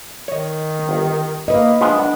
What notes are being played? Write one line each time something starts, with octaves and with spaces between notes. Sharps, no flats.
D#3 C#5 D#5
G1
A#3 B4 D#5
F3 G#3 B3 D4
B3 D4